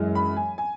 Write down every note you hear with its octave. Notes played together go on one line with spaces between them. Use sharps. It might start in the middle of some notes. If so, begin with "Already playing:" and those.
Already playing: F#2 E3 G#3
B5
G#5
G#5